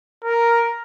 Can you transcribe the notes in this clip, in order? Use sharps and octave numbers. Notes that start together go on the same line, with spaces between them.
A#4